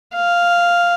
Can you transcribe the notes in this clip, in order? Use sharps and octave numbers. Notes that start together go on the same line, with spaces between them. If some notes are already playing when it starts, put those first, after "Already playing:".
F5